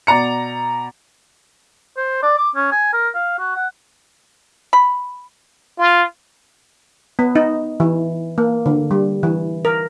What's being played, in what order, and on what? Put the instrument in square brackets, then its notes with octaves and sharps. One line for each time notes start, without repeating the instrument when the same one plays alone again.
[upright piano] B2 D5 A#5 C#7
[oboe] C5
D5
D6
C#4
G#5
A#4
F5
F#4
F#5
[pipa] B5
[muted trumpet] F4
[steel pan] B3
D#4
E3
A#3
D3
G3
E3
A#4